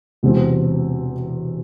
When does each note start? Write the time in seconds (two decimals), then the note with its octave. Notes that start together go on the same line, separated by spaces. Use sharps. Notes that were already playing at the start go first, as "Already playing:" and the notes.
0.23 E1 E2 C3 F#3 C4